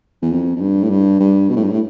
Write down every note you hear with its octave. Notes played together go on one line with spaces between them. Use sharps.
E2
F2
F2
G2
A2
G2
G2
B2
A2
G2
A2